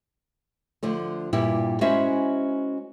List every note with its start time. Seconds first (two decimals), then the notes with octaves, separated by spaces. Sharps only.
0.83 D3 F3 A3
1.33 G2 A#2 G3 E4 G4
1.81 G#3 C#4 E4 F#4 C5 E5